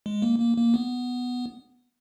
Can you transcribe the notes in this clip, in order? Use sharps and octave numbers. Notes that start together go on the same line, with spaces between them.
G#3
A#3
A#3
A#3
B3